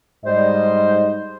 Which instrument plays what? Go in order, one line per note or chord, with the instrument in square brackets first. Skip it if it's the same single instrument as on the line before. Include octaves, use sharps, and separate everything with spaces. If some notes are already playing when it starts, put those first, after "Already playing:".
[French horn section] G#2 D#5 [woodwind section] G3 C5